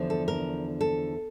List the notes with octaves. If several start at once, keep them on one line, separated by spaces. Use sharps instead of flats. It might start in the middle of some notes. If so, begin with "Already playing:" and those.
Already playing: E2 D3 F3
A4
A#4
A4